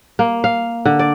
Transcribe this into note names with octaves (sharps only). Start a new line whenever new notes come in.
A#3
F5
D3
D5